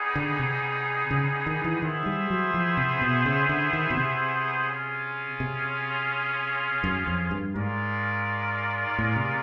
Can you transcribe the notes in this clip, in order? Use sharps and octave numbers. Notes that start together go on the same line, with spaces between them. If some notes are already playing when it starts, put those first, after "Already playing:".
Already playing: G3 B3 D#4 G#4
D3
C3
C#3
D#3
E3
D#3 B3 E4 G#4 C5 E5
G3
F#3
F3
C3
B2
C#3
D3
D#3
B2
C3
C#4 F4 G#4
C3
F#2
F2
G2
G#2 G#3 C#4 F4 A#4 D5
A2
C3